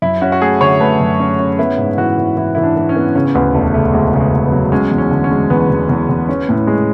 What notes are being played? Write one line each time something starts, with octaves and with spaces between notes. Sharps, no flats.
F#2 E4
C#4 F#4
F#4
A3 G#4
D3 C#5
A3 B4
F#2
C#4
C#4
B3 E4
G#2
E3 F#4
E3
E3 E4
E3 E4
D4
E3
C#4
B3
C#3 C#4
C#4
D2 B3
E1 A3
C#3 A3
D2 G#3
C#3
G#3
D2
B3
F#3
G#3 C#4
E2
C#4
D3
C#4
G#3
E2 B3
E2
E2
E2
C#4
A2
G#3